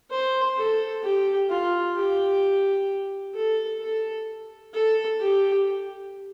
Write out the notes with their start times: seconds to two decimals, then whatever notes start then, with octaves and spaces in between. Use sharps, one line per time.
0.11 C5
0.57 A4
1.03 G4
1.50 F4
1.96 G4
3.35 A4
3.81 A4
4.74 A4
5.21 G4